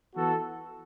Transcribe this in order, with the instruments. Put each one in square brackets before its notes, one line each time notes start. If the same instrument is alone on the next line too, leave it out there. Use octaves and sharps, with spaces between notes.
[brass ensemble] E3 B3 F#4 A4